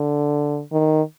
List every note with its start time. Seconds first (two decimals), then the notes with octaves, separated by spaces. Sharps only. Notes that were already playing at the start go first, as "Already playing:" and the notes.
Already playing: D3
0.72 D#3